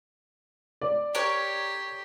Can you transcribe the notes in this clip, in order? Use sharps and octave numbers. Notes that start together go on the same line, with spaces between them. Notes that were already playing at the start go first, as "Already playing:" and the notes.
D5
G4 A#4 C#5